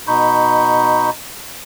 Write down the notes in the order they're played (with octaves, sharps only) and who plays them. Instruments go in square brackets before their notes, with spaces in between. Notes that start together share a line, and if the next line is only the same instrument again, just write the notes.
[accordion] B2 D#4 B5 C#6 G6